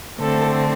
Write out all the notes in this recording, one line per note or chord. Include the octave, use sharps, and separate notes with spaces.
D3 A3 C4 A4